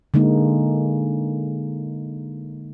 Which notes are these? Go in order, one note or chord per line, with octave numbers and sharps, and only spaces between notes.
D3 G#3 A#3 D#4